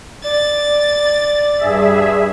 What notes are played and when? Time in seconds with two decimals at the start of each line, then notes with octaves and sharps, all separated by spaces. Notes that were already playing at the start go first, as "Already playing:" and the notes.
0.23 D5 A6
1.59 G2 G#4 E5